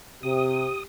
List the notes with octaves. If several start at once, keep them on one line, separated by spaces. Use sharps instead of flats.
C3 G4 D#6